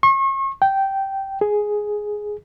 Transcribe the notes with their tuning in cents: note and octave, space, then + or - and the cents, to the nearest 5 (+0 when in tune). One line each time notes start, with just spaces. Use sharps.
C#6 -40
G5 -10
G#4 +5